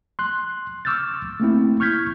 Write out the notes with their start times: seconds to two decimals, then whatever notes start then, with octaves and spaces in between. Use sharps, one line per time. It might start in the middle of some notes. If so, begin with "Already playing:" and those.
0.19 C6 F#6
0.85 C#6 D6 E6 F6 G6 A6
1.40 A3 A#3 C4 E4
1.80 C#6 F6 G6 G#6 B6